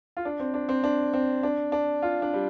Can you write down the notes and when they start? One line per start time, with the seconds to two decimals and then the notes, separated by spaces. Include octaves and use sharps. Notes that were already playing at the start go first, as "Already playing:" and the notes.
0.17 F4
0.25 D4
0.40 C4
0.54 D4
0.69 C4
0.84 D4
1.13 C4
1.43 D4
1.72 D4
2.02 F4
2.22 D4
2.34 G3